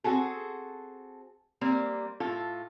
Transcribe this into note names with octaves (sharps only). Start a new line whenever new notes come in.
C4 F#4 G#4 A4
G3 A#3 C4
A2 F4 A4